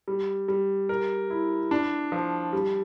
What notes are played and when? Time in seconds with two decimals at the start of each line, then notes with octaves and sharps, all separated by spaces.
0.08 G3
0.48 G3
0.89 A#4
1.30 E4
1.71 D4
2.12 F3
2.53 G3